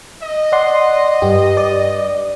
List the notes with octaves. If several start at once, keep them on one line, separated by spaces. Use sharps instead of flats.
D#5
D5 F#5 C6
G2 G4
D5